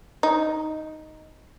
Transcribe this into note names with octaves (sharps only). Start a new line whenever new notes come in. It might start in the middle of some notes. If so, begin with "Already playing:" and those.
D#4